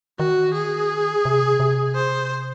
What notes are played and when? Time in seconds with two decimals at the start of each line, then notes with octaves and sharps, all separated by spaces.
0.19 D#3 F#4
0.54 G#4
1.25 C3
1.60 C3
1.95 C5